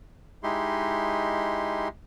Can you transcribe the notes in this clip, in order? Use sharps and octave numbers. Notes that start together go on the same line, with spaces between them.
G#3 D#4 E4 G4 C6